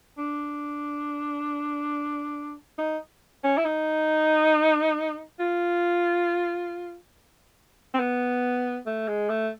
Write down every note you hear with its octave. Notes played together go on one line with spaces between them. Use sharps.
D4
D#4
C#4
E4
D#4
F4
C4
B3
A3
G#3
A3